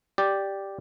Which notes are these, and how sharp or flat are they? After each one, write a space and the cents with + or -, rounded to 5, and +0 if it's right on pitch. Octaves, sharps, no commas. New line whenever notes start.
G4 +0 D5 +0